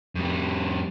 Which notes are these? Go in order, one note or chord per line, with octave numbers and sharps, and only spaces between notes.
F2 G3